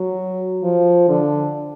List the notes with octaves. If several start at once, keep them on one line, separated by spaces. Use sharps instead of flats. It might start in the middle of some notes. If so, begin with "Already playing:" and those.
Already playing: F#3
F3
D3